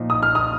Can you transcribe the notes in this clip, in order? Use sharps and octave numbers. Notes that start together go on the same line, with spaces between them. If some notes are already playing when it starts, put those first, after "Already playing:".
Already playing: A#2 F3 D#4
D#6
F6
D#6